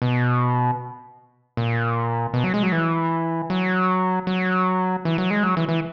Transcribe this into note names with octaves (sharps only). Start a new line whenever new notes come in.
B2
A#2
B2
F#3
G#3
F#3
E3
F#3
F#3
E3
F#3
G#3
F#3
E3
E3